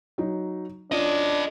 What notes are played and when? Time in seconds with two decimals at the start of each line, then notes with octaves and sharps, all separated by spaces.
0.18 F#3 D#4
0.92 C#4 D4 F4 A4 D#5